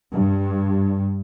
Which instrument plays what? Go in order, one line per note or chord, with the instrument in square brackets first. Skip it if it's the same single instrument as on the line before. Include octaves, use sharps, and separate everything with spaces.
[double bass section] G2